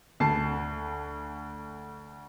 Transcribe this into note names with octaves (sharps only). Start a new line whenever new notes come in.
D2 A5 C7